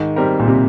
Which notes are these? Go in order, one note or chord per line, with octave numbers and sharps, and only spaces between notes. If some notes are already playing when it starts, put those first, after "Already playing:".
Already playing: G#2 D#3
G3 C4 G4 A#4
A#2
C3